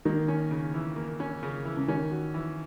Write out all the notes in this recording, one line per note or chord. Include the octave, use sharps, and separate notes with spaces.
D#3 A#3
C#4
C#3
E3
A#3
C#4
C#3
E3
C#3
D#3 C#4
F#4
E3